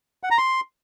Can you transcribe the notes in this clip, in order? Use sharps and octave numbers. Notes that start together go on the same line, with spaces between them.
F#5
A#5
C6